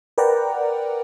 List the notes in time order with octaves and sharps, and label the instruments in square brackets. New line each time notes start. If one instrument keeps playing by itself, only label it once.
[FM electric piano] A#4 B4 D5 F#5 G5 A#5